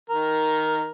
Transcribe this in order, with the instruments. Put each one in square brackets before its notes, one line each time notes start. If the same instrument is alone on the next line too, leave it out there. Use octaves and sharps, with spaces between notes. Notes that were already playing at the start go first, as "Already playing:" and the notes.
[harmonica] D#3 A#4